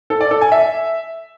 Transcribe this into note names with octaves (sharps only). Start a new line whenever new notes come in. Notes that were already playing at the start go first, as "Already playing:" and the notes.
A4
D5
A4
G#5
E5